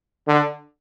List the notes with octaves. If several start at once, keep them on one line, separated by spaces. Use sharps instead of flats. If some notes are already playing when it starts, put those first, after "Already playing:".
D3